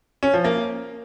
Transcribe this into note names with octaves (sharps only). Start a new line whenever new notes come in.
C#4
F3
A#3